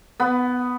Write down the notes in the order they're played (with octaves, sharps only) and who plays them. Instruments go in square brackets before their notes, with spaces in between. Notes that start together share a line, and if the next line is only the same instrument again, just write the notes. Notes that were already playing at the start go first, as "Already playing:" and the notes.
[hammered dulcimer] B3